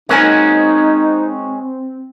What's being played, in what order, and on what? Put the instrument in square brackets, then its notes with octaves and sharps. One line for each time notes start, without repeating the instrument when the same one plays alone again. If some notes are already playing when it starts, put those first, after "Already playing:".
[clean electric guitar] G#3 C#4 F#4 [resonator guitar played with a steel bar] A#3 A#4 G#5 [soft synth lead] C4 [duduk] D#4